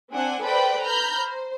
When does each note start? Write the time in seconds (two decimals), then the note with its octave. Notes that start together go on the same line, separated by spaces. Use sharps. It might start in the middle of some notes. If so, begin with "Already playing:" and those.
0.13 C4 D4 F#5 G#5
0.42 A4 B4 C5 D5 G5 B5
0.85 A#5 B5 F6 G6
1.16 C5